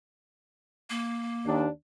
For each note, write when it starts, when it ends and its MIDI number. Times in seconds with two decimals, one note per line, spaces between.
0.90 1.59 58
1.46 1.67 39
1.46 1.67 62